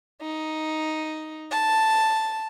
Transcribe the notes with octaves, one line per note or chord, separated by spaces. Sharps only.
D#4
A5